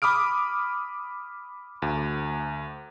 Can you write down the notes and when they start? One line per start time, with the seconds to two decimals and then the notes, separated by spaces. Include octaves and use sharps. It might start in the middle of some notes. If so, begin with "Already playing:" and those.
0.02 B5 D6 D#6 F6 D7
1.82 D2